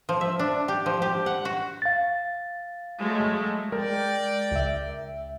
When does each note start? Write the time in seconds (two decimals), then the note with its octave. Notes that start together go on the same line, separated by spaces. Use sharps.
0.09 F3
0.21 E5
0.39 D4
0.68 G4
0.86 F3
1.02 G4
1.26 F#5
1.45 F#4
1.82 F5 A6
2.99 F#3 G#3 A3
3.72 G#3 A#4 D5 G5
4.52 C#2 E5